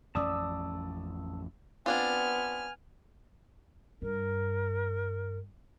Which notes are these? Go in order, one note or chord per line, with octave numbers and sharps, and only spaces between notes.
A1 F2 C#4 D5 A5 D#6 E6
B3 C4 D4 F4 G#5 F6
G2 A#4